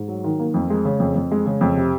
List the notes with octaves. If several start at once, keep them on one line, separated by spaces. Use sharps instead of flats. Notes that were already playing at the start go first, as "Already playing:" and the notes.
Already playing: G#2
F#3
D#3
A#3
F2
G#3
C#3
F2
F2
G#3
C#3
F2
C3